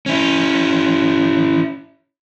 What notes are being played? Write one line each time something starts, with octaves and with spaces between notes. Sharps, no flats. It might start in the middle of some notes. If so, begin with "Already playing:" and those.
C#4 E4